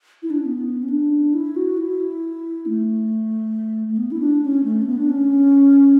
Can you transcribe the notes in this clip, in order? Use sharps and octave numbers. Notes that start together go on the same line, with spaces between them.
E4
D4
C#4
B3
C#4
D4
E4
F#4
E4
A3
A3
B3
E4
D4
C#4
A3
C#4
B3
D4
C#4